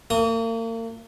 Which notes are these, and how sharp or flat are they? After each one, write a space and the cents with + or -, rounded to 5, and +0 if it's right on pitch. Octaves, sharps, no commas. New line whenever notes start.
A#3 -40 D#6 +5